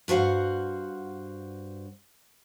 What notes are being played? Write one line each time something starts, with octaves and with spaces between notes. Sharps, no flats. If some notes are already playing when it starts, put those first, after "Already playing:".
G2 F#4 C5 F5 F#5